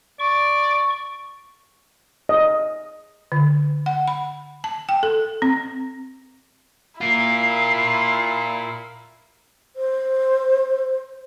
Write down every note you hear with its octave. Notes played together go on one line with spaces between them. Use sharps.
D5 C#6
D#5
D3
F#5
B5
A5
G5
A4
C4
E4 F4 A#4 C7
C5